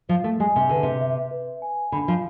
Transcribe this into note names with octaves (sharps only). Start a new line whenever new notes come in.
F3 C5
A3
G#3 G#5
C3
D3 B4
C3
E5
B4
G#5
D3 B5
F3